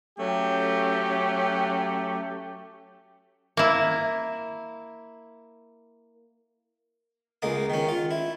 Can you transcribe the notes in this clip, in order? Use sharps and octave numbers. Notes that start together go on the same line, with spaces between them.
F#3 A3 C#4 G4
A#3 E4
C#2 G#3 A#3 D#6
D#3 C#4
F4
E4